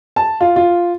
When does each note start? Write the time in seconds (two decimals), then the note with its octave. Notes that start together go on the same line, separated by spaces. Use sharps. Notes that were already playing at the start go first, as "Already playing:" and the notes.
0.16 A5
0.41 F4
0.56 F4